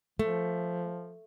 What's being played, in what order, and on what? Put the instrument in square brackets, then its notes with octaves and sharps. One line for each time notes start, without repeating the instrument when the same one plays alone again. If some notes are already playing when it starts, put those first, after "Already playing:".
[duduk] F3 [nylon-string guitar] A3